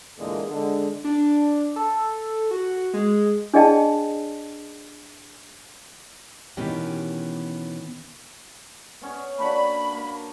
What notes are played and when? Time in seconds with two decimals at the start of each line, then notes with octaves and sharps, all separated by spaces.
0.18 E2 A#2 D3 G#3 A#3
0.50 D3 G#3
1.04 D4
1.76 A4
2.51 F#4
2.94 G#3
3.54 D4 G#4 D5 D#5 G5 A5
6.57 B2 D#3 E3 B3 C#4 G4
9.01 B3 C#4 C#5
9.38 A#3 D4 F#4 B5
9.92 A#3